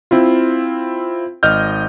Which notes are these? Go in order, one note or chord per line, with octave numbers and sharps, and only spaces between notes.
C4 E4 F4
G#1 D#5 F6 G6